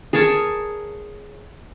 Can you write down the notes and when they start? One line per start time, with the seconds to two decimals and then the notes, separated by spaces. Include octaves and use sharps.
0.13 G#4 A#4 C#5 A5